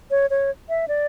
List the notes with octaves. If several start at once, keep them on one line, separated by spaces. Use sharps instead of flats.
C#5
C#5
E5
D5